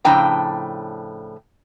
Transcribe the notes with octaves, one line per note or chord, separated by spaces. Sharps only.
A2 C#3 F3 D4 G5 A#5